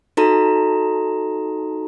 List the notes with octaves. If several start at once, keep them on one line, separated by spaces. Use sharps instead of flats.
D#4 F#4 A4 A#5